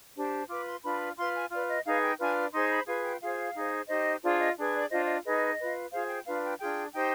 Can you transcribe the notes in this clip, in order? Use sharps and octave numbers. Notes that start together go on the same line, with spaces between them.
D4 G4 C5
F4 B4 D6
C6
D4 F4 B4 B5
F4 B4 C6
G#5
F4 B4 D5
D#5
D#4 G#4 B4 F5
G5
D4 F4 B4 G#5
D#4 G#4 C5 C6
B5
F4 G#4 B4 G#5
G5
F4 G#4 C5 F5
D#4 G#4 C5
D#4 G4 C5 D#5
D4 F4 G#4 C5 D5
D#5
D4 G#4 B4
D5
D4 F4 C5 D#5
D#5
D#4 G#4 B4 D#5
F4 B4
F4 G#4 C5 F5
G5
D4 F4 B4 F5
G5
D4 F4 G#4 G5
D#4 G4 C5 G5